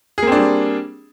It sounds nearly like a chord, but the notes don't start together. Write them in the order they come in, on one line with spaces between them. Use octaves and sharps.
G#4 A#3 C4 D4 G3